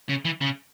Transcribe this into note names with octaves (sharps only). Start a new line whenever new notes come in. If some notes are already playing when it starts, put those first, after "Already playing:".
C#3
E3
C#3